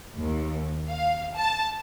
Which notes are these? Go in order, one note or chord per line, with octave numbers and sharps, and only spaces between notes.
D#2
F5
A5